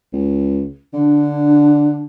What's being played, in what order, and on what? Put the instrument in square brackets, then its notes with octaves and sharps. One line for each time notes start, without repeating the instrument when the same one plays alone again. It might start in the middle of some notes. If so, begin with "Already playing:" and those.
[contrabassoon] C#2
[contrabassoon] D3 [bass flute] D4